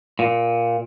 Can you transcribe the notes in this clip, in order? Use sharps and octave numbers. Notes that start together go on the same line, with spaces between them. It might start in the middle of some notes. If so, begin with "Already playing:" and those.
A#2